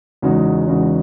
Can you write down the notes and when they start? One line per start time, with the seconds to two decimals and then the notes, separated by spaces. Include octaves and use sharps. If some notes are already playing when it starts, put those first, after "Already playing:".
0.22 E2 C#3 G#3 D#4 F#4
0.67 E2 C#3 G#3 D#4 F#4